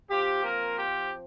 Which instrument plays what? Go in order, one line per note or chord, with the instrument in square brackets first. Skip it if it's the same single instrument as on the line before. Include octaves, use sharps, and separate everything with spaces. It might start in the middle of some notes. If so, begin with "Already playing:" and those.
[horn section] F3 C4 F4 G4
A#3 A#4
G4